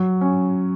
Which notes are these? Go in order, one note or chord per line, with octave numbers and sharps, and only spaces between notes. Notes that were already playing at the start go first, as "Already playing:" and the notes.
Already playing: F#3
C#4